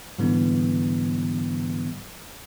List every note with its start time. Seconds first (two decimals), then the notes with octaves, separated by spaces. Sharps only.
0.19 G#2 D3 E3 G3 B3